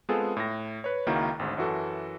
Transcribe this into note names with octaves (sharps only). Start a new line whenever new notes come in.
G#3 B3 C4 F4 G#4 A4
A2 A#6
B4 C#5
C#2 D#3 A#3 E4 F#4
G#1 D2 G#2
F#2 E3 F#4 A4